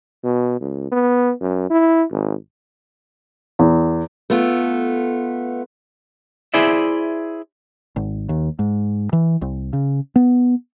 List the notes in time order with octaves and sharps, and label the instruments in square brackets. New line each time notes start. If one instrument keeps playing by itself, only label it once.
[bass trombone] B2
C#2
B3
F#2
E4
G#1
[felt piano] E2
[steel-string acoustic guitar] A3 B3 F4
[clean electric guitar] E4 G#4 C5 D5 E5
[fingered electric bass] G#1
D#2
G#2
E3
C2
C#3
B3